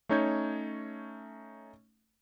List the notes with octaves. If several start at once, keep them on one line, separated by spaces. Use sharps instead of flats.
A3 C#4 D#4 C#5 G6 G#6